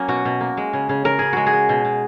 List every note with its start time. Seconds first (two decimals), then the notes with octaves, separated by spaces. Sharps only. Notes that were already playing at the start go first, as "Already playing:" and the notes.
Already playing: F#3 A#3 C#4
0.08 B2 F#4
0.25 B2
0.41 A#3
0.57 G#3
0.73 C#3
0.89 C#3
1.04 C#3 A#4
1.19 C#3 G#4
1.33 G#3 F#4
1.46 G#4
1.53 G#3
1.69 B2
1.85 B2